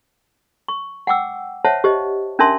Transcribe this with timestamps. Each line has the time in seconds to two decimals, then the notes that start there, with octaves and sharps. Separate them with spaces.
0.68 C#6
1.07 F#5 G5 D6 E6
1.65 C5 C#5 E5 F#5 A5
1.84 G4 C5 D#5
2.39 C#4 D4 A#4 E5 A5 C6